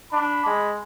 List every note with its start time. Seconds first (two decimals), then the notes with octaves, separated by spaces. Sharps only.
0.13 D4 B5
0.46 G#3